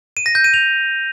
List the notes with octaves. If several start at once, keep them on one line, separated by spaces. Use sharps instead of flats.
D#7
A#6
G6
D#7
F7